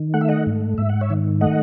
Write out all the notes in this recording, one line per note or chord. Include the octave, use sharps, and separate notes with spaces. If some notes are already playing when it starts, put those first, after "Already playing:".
Already playing: D#3
A3 F#5
E5
D#5 F#5
G#2
G#2 E5
F#5
C#5 E5
D#3
A3 D#5 F#5